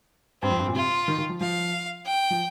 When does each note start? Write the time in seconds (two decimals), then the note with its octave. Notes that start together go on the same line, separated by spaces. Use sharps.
0.42 G2 C4
0.51 F2
0.59 G2
0.68 A#2
0.75 C3 F4
1.08 D#3
1.18 D#3
1.29 F3
1.41 F3 F5
2.06 G5
2.30 F3